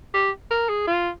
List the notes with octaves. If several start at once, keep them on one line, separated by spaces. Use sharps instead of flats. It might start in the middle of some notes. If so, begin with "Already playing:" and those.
G4
A#4
G#4
F4